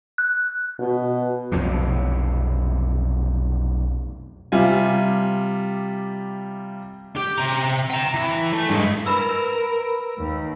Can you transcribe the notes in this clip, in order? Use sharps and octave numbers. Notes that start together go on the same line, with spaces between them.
F#6
B2
B1 F2 A2 C3
C3 G3 F4 E5 G#5
G4
C3 A#5
G5 A#5
E3
A3
G2 G#3
A#4 B4 B5 E6
D#2